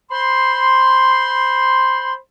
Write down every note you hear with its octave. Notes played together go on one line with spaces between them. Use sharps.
C5 B5 C6